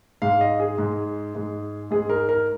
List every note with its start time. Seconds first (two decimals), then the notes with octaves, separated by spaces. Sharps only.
0.22 G#2 G#3 F5
0.41 D#5
0.60 G#4
0.78 G#2 G#3
1.35 G#2 G#3
1.91 G#2 G#3 G#4
2.10 A#4
2.29 A#4